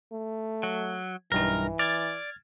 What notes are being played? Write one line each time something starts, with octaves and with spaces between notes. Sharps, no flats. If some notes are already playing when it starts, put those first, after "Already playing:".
A3
F#3
B1 G2 E3 D#4 A#4
D5 F6 G#6 A6